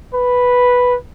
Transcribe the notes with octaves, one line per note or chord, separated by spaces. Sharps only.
B4